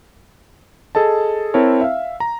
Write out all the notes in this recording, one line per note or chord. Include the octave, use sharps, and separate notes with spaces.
G#4 A4 D#5 A5
C4 E4 A#4 C#5 A5
E5 F5
A#5